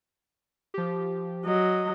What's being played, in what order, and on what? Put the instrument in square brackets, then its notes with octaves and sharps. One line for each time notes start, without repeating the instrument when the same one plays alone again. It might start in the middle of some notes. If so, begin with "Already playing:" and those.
[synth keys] F3 G4
[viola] F#3 D#5